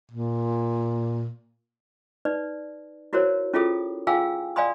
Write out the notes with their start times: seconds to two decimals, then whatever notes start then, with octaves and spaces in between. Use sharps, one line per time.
0.11 A#2
2.25 D#4 B4 D5
3.13 E4 F#4 A#4 C5 C#5
3.53 C#4 E4 F4 G#4 A4 D#6
4.07 F4 G#4 F5 G5 G#5 E6
4.56 D5 F5 G#5 B5 C6 D#6